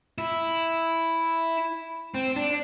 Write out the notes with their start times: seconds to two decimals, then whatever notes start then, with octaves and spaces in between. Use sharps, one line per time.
0.18 E4
2.15 C4
2.36 D4